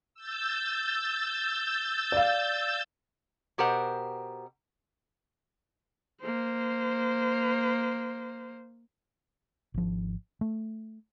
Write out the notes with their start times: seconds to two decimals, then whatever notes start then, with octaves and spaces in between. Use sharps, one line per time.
0.14 E6 G6 A6
2.12 D5 F5
3.58 B2 G4 A#4 C5 F#5
6.21 A#3 C5
9.74 G#1 F3
10.41 A3